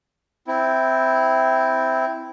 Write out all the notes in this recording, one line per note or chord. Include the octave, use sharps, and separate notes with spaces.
C4 E4